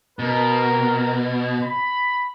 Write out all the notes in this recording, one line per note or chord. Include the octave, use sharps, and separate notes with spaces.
B2 A#4
B5